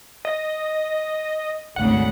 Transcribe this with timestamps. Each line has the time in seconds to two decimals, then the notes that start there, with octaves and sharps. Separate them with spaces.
0.25 D#5
1.76 G#1 D2 C#3 F#5